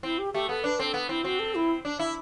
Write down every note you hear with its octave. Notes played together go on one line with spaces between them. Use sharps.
C4 E4
G4
A3 G4
B3 A4
D4 B4
C4 A4
B3
C4 E4
C4 F#4
A4
E4
D4
E4